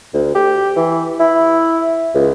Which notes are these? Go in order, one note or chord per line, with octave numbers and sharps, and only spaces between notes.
D2
G4
E3
E4
C#2